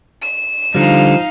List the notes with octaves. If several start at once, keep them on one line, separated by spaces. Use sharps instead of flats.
E7
D3 F3 G3 D#4 F5